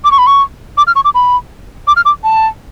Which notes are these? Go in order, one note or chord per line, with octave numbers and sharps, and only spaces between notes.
D6
C#6
B5
C#6
D6
F6
C#6
D6
B5
D6
F6
D6
A5